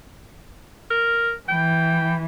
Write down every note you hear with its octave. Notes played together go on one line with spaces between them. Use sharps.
A#4
E3 G5